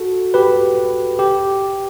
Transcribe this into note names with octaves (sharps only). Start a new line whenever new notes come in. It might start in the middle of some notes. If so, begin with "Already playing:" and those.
Already playing: F#4 A4
G4 B4
G4